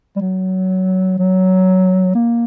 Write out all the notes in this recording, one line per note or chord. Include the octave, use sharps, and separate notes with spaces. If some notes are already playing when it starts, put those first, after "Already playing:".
G3
F#3
F#3
A#3